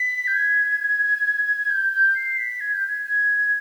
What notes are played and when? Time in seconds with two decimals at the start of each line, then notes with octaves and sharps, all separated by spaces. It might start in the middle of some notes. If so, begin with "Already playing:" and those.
Already playing: B6
0.27 G6
0.33 G#6
1.70 G6
1.93 G6
2.15 C7
2.38 B6
2.61 G#6
2.74 G6
2.87 G#6
3.06 G#6